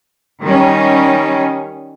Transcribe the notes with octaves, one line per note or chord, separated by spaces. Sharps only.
D#3 G3 C#4